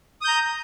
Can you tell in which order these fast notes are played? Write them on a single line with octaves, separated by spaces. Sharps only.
D#6 G6 A#5